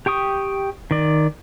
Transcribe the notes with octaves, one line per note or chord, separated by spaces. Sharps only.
G4 G5 C#6 D#6
D#3 D5